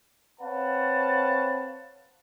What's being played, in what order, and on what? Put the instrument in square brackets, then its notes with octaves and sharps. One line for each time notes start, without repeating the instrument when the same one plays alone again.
[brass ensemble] C4 B4 C#5 F5 F#5 A5